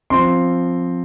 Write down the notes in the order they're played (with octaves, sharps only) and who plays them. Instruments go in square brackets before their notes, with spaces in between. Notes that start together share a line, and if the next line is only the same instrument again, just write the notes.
[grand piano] F3 C4 C6